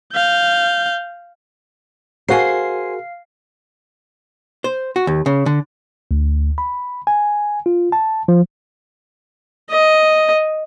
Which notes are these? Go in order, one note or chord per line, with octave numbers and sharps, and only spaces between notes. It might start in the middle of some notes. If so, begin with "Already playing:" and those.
F5 G6
F#4 G#4 A#4 C5 F5 G#5 C7
C5
F#4
D#2
C#3
D3
D2
B5
G#5
F4
A5
F3
D#5